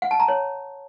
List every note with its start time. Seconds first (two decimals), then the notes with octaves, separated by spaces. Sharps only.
0.02 F#5
0.11 A5
0.20 A#5
0.28 C#5